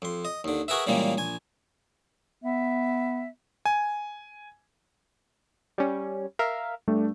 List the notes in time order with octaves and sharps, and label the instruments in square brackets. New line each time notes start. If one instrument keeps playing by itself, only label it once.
[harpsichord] F2 C6
D#5
D#2 D3
F#4 G#4 A#4 B4 E5
A#2 C#3 E3 G3 G#3 A#3
A#1 G#5
[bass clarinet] B3 [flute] E5
[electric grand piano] G#5
[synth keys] G3 C#4
A#4 E5 F5
[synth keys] G2 [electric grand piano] A3 D4